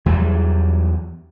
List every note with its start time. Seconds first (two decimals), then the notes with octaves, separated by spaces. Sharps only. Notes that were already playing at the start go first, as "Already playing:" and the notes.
0.06 E2 E3 F#3 G3